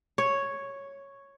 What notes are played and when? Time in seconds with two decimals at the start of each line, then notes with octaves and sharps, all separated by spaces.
0.18 C#5